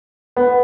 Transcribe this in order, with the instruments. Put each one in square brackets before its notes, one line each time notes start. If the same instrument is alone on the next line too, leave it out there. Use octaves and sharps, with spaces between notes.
[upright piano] B3